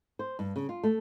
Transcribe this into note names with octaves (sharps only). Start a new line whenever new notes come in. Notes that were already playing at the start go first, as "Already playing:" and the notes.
C5
G2
C#3
F4
A3